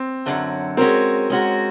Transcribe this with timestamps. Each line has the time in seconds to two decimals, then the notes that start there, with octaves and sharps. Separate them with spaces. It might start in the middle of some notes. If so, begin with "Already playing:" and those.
Already playing: C4
0.26 F#2 D3 F#3
0.77 G#3 C4 C#4 F#4 A#4
1.30 G#3 C#4 F#4 A#4